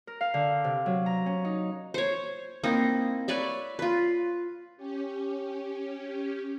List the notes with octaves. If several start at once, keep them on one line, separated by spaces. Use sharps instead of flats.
A#4
F5
D3
C3
F#3
A#5
C#4
D#4
C5 C#5
A#3 C4 D#4 E4
B4 C#5 D5 E5
F4 B4
C#4 G4